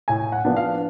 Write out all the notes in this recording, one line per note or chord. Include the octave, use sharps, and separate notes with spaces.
A2 G#5
F#5
F3 B3 D4
F5